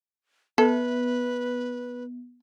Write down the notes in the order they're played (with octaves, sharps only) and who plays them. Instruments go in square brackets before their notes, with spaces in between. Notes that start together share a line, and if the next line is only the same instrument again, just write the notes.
[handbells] B3 [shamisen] A4 [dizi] B4